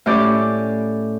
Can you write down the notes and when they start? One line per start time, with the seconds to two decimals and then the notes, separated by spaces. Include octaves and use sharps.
0.06 A2 C#4 G4 D5